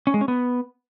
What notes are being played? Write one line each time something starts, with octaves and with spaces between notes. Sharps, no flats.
C#4
G#3
C#4
B3